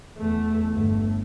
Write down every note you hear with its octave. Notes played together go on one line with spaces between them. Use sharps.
E2 A3
G1 A3